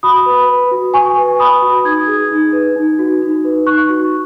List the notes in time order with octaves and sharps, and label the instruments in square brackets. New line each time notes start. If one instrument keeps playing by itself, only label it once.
[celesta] F#4 B5 D#6
B4
B4
F#4
F#4 G#5 C#6
B4
B4 B5 D#6
F#4
D#4 D#6 G#6
G#4
D#4
B4
D#4
F#4
D#4
B4
D#4 C#6 F#6
F#4